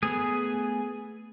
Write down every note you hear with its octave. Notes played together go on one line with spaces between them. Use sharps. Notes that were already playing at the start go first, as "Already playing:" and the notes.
A3 B3 G#4